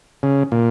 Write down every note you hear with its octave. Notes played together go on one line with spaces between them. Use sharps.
C#3
A#2